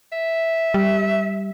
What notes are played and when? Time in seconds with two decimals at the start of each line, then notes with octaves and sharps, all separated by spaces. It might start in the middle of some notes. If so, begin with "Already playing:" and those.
0.12 E5
0.74 G3